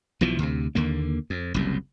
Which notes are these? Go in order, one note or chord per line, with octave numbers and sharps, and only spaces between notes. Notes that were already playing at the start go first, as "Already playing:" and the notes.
B1 B2 E3 F3
D2 C3
D#2 D3 A#3
F2
F#1 C2 F#2